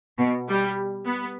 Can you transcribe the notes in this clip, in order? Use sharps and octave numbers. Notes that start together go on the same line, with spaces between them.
B2
G3
B3